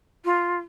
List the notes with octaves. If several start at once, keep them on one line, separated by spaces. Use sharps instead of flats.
F4